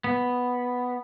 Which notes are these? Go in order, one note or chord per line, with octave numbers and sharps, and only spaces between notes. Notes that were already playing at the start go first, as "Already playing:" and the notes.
B3